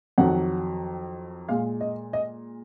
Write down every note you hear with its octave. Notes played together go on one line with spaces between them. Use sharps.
F2 D#3 F#3 F#5
A#2 G#3 F5
D#5
D#5